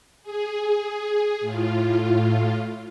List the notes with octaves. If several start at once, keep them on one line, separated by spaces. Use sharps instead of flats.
G#4
A2 F4